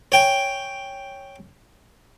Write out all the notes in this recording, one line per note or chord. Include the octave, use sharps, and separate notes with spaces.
C#5 G5 G#5